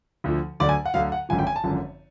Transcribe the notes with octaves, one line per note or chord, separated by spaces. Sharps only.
D2 D3 F3
D2 D3 F#3 D5
G#5
F#5
D2 D3 F#3 F5
F#5
G#1 F#2 D3 F3 G#5
G5
G#5
A5
G#1 F#2 D3 F3